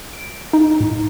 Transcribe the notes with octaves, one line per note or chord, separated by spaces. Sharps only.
D7
D#4
A2